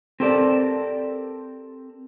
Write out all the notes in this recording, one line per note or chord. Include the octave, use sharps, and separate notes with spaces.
C4 G4 A4 A#4 D5